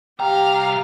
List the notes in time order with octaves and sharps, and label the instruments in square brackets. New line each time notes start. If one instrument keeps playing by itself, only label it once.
[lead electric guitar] C2 A#5 [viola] G4 F5 [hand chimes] G5